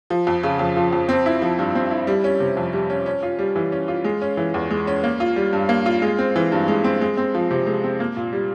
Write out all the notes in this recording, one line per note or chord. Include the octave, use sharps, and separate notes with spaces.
F3
F2
C#3
F2
F3
F2
C4
E4
F3
G2
C4
E4
G3
C#4
C3
F2
G3
C#4
C#4
F4
G3
E3
C#4
F4
G#3
C#4
E3
E2
G#3
C#4
A#3
F4
G3
G2
A#3
F4
G#3
C4
E3
G2
G#3
C4
G#3
C4
F3
C3
G#3
C4
A#3
A#2
G3